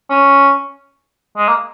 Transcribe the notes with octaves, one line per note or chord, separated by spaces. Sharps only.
C#4
G#3
A#3